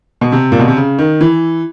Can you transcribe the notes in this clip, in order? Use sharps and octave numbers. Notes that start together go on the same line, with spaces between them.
B2
C3
A#2
B2
C3
C#3
D#3
E3